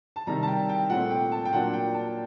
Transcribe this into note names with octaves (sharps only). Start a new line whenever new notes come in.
A5
C3 D#3 G3 A#5
A5
G5
G5
A#2 A3 C4 F#5
G5
A5
G5
A#2 F#3 A#3 D4 F#5
G5
A5